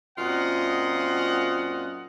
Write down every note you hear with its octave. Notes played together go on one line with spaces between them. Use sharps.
F#2 A#2 C4 F4 D#5 F#5